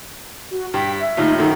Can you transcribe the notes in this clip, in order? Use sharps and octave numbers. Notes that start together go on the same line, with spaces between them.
F#4
G2 G5 B6
E5
D#2 A2 D#4 F4
F#2 D#3 D#4 A4